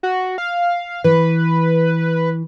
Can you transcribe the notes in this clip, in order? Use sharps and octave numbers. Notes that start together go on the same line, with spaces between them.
F#4
F5
E3 B4